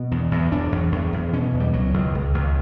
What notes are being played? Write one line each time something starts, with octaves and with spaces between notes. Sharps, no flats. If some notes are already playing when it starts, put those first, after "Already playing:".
Already playing: B2
E2
E2
E2 D4
E2
E2
E2
B2 C#4
E2
G3
C#2 F#3
C#2
C#2
C#2